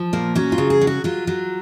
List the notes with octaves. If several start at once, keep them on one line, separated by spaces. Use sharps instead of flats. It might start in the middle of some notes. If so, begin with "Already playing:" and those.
Already playing: F3
A#2 A#3
F#3 C#4
F4
C#3
G#4
F#3
F#4
F#3 F4
F#3